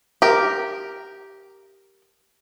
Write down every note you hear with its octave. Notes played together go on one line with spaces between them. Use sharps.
G4 A#4